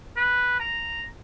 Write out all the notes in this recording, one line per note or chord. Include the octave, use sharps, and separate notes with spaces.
B4
A#5